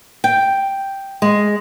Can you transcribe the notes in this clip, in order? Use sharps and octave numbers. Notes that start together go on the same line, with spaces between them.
G5
G#3